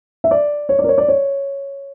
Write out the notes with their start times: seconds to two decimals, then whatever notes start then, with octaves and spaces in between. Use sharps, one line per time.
0.24 E5
0.31 D5
0.69 C#5
0.79 D5
0.84 A#4
0.89 C#5
0.98 D5
1.08 C#5